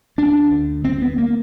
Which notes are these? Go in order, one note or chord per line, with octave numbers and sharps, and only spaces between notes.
D2 D4
D2
D2 C4
B3
A#3